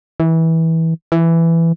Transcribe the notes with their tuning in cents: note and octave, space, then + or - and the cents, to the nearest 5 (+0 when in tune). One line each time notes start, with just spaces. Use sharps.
E3 -20
E3 +10